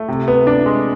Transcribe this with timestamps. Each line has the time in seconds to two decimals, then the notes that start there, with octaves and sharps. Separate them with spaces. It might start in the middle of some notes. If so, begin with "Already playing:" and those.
Already playing: A3
0.08 C3
0.28 B3
0.47 D4
0.66 G#3